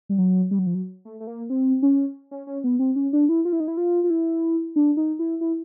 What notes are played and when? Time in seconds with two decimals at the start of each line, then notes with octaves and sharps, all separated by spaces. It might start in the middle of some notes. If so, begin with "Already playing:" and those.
0.09 G3
0.18 F#3
0.51 G3
0.59 F#3
0.67 F3
0.74 F#3
1.05 A3
1.20 A3
1.27 A#3
1.50 C4
1.82 C#4
2.31 C#4
2.47 C#4
2.64 B3
2.79 C4
2.96 C#4
3.13 D4
3.29 E4
3.45 F4
3.53 E4
3.60 D#4
3.68 E4
3.77 F4
4.04 F4
4.10 E4
4.76 D4
4.97 D#4
5.19 E4
5.41 E4